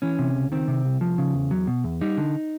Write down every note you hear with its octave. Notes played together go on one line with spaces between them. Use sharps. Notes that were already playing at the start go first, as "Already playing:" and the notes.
E3 C#4
C3
C#2
D#3 C4
C3
C2
F3
C#3
E2
F#3
B2
E2
G3 D#4
D3